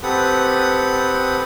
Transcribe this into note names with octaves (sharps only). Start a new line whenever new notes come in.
C4 G4 A4 B4 F#5 D#6